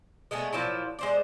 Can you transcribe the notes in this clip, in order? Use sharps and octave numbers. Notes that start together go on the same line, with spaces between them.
G#3 A3 B3 G#4
A#2 F3 F#3 E4
G#3 C5 D5